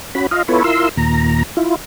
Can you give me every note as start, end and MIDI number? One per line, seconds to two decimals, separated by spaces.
0.15 0.27 61
0.15 0.27 66
0.15 0.27 83
0.31 0.43 65
0.31 0.43 75
0.31 0.43 77
0.48 0.63 59
0.48 0.63 64
0.48 0.63 65
0.48 0.63 69
0.48 0.63 71
0.48 0.63 73
0.64 0.89 64
0.64 0.89 65
0.64 0.89 70
0.64 0.89 84
0.64 0.89 88
0.97 1.43 39
0.97 1.43 46
0.97 1.43 82
1.57 1.76 64
1.57 1.76 65